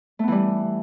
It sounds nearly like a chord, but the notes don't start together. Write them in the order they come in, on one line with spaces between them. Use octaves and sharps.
A3 B3 E3 G3